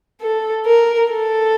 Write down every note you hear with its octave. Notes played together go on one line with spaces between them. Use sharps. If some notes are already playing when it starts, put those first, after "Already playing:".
A4
A#4
A4